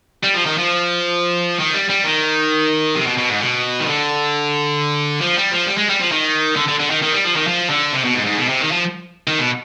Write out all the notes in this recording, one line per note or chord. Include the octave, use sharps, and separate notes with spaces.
G3
F3
D#3
F3
D#3
G3
G3
D#3
C3
B2
B2
G#2
B2
D#3
D3
F3
G3
F3
G3
G#3
G3
F3
D#3
D3
D3
D3
D#3
D#3
G3
F3
D#3
F3
D3
C3
B2
G#2
G#2
B2
C3
D#3
F3
D#3
B2